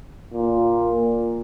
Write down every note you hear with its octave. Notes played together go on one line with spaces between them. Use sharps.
A#2